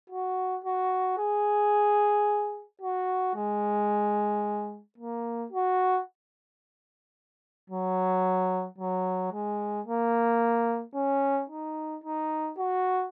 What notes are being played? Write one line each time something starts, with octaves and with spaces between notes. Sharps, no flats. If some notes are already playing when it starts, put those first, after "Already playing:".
F#4
F#4
G#4
F#4
G#3
A#3
F#4
F#3
F#3
G#3
A#3
C#4
D#4
D#4
F#4